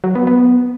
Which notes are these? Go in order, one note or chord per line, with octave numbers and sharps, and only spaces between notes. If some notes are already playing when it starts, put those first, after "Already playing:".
F#3
B3
B3